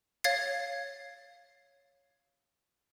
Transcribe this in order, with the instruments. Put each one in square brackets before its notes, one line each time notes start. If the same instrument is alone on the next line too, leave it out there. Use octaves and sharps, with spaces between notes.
[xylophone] C#5 F5 G#6 A6 C7